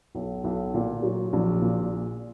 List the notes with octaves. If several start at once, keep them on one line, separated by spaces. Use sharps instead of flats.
B1
B1
A#2
F#3
A#1
A#2